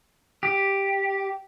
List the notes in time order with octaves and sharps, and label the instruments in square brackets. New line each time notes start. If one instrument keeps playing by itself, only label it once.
[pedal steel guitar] G4